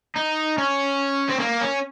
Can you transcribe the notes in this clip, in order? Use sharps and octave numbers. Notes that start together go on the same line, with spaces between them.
D#4
C#4
C4
A#3
C#4